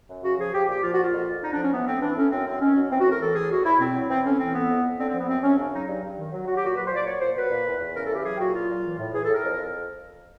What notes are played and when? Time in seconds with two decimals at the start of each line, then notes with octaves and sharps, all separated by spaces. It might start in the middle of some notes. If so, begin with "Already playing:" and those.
0.09 F#2
0.23 C#3 F#4
0.38 F3 G#4
0.53 F3 G4
0.67 A#2 G4
0.82 F3 F4
0.93 F#4
0.97 A#2
1.03 F4
1.12 F2
1.26 F2
1.41 D3 D#4
1.52 D4
1.57 F3 C#4
1.71 E3 B3
1.86 A2 C4
2.01 E3 D4
2.16 A2 C#4
2.30 F#2 C4
2.46 F#2 C4
2.60 D#3 C#4
2.75 F#3
2.90 E3 C4
2.99 F#4
3.04 A2 A#4
3.19 E3 A4
3.34 A2 G#4
3.49 E2 F#4
3.64 E2 E4
3.79 B2 C4
3.94 F#3
4.09 E3 C4
4.24 A2 C#4
4.39 E3 C4
4.53 A2 B3
4.68 F2
4.83 F2
4.98 D3 C4
5.08 C4
5.13 F3 B3
5.27 F#2 C4
5.42 F#2 C#4
5.57 C#3 D4
5.72 F#3 D#4
5.87 G2
6.02 G2
6.16 D#3
6.32 F#3
6.46 F#3 F#4
6.56 G4
6.62 A#2 F#4
6.76 F#3 B4
6.85 C5
6.90 A#2 D5
7.05 F#3 C#5
7.20 A#2 C5
7.35 F#3 B4
7.50 A#2
7.66 E2
7.80 E2
7.95 C#3 A#4
8.05 A4
8.10 E3 G4
8.24 F#3 G#4
8.35 G4
8.39 A#2 F#4
8.53 F#3 F4
8.69 A#2
8.84 E3
8.98 A2
9.13 E3 G#4
9.23 A4
9.28 A2
9.34 A#4
9.44 F2
9.57 F2